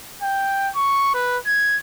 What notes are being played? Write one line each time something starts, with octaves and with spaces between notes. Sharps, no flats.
G5
C#6
B4
G#6